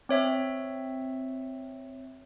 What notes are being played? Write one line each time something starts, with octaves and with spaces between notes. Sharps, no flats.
C4 C#5 E5